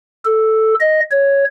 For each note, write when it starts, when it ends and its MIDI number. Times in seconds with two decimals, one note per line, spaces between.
0.25 0.74 69
0.80 1.00 75
1.11 1.44 73